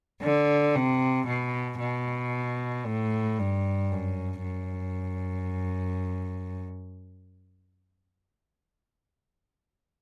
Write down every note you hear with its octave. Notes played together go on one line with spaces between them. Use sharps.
D3
C3
B2
B2
A2
G2
F#2
F#2